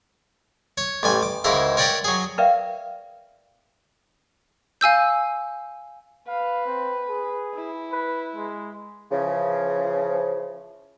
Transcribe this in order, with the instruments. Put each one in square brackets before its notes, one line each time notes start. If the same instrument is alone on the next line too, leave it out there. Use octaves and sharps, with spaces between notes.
[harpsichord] C#5
A1 G3 G#5
D6
C#2 G#2 E4 A#4 E5
A#4 C#5 D5 G5 A#5 B5
F#3 G#4
[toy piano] A#4 B4 D5 E5 F5 G5
[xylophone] F5 G#5 E6 G6
[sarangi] B4 [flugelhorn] F5
[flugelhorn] C4
G#4
[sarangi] E4
[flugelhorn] B4
G#3
[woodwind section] C#3 E3 F3